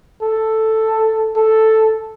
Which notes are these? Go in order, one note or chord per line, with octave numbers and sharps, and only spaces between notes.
A4
A4